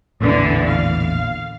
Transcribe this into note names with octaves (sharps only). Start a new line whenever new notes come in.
A1 E2 A#2 D3 E3
F5